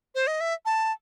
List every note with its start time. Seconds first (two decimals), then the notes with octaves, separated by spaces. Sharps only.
0.15 C5
0.27 D#5
0.41 E5
0.65 A5